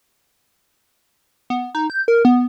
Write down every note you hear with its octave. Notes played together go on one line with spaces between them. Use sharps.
B3
D#4
G6
A#4
B3